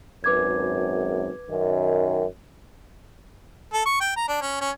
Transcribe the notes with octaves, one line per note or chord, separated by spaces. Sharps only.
G#1 F#2 B4 D6 G#6
F#2 D#3
A4
C#6
G5
A#5
D4
C#4
C#4